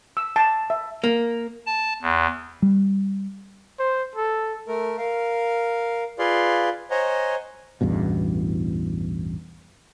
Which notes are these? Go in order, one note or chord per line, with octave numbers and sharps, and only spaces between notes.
E6
A5
E5
A#3
A5
E2
G3
C5
A4
A3 A#4
A#4 F5
F4 G#4 B4 D5 F5 C6
C5 C#5 D#5 F#5 G#5 A#5
A1 E2 G2 B2